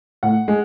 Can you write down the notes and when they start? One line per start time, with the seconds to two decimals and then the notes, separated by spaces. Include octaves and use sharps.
0.23 A2 F#5
0.48 G#3